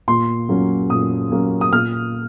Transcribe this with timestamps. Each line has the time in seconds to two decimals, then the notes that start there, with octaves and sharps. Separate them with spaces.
0.08 A#2 C6
0.49 F#3 A#3 C#4
0.90 A#2 D#6
1.32 F#3 A#3 C#4
1.61 D#6
1.72 A#2 F6